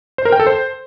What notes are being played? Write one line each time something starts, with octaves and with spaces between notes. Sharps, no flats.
C5
A#4
G5
A4
C5